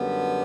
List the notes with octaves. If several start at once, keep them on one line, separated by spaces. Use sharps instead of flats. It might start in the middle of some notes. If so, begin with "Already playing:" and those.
Already playing: F#2 D3 G3 B3